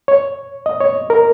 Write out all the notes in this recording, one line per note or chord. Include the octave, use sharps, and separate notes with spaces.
C#5
D#5
C#5
A#4